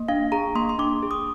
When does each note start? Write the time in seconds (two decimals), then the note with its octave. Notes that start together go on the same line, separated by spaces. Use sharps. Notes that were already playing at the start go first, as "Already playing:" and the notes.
Already playing: A#3
0.08 D4 F5
0.32 G#4 A#5
0.55 A#3 C6
0.69 C6
0.79 D4 D6
1.03 G#4
1.11 D#6